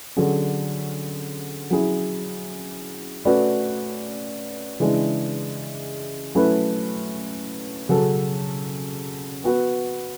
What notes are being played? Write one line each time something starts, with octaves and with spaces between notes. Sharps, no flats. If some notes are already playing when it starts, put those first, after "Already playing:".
D3 F#3 C#4 G#4
F#3 C#4 E4 G#4
A3 C#4 F#4 B4 D5
C#3 E3 G#3 D4 G#4
F#3 A3 C#4 E4 B4
C#3 F#3 C#4 F#4 A4
B3 F#4 B4